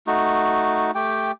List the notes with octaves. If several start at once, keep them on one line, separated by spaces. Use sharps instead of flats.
A3 D#4 F#4
A3 G4 G5